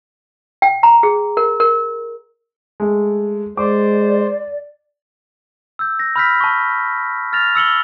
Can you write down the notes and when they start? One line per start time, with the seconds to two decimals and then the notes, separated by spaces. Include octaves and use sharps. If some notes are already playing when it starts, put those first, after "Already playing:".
0.62 G5
0.83 A#5
1.03 G#4
1.37 A#4
1.60 A#4
2.80 G#3 A3
3.57 G#3 C5 D5 D6
5.79 E6 G6
5.99 A#6
6.16 B5 E6 F6 G6 A#6 B6
6.41 A5 C#6
7.33 F6 A6 A#6 F7
7.55 E6 C#7 F#7 G7